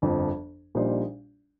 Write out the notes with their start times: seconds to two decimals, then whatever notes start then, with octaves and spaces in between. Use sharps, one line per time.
0.02 G1 F2 F3
0.75 A#1 A#2 G3 D#4 C5